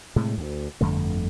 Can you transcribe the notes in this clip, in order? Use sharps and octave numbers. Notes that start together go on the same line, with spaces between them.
A2 C3 G#3
D2
G1 F2 D3 A3